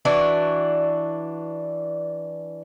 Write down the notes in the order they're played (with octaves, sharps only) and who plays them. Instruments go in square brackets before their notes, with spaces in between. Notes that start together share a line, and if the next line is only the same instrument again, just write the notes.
[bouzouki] E3 D4 F#4